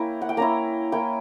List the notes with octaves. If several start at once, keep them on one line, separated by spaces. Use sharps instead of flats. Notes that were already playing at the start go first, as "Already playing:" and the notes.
Already playing: A#3 C#4 E4 G5 A#5
F#5
G5
A#3 C#4 E4 A#5
A#3 C#4 E4 G5